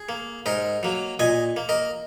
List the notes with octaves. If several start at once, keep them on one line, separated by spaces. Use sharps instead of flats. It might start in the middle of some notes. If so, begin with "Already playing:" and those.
Already playing: G#4
A#3
G#2 A#4 D#5
F#3 A#3
A#2 D#5 G#5
A#3
A#4 D#5